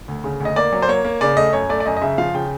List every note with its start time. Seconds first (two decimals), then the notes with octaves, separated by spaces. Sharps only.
0.08 D2
0.24 C#3
0.40 D2
0.45 D#5
0.56 A#3 D5
0.72 F#3
0.82 C5
0.88 A#3 C#5
1.05 A#3
1.21 C#3 D5
1.37 A3 D#5
1.53 F#2 C#5
1.69 A3 D5
1.80 D5
1.86 F#2 D#5
1.97 D#5
2.02 C#3 E5
2.18 F3 F5
2.34 C#3 G5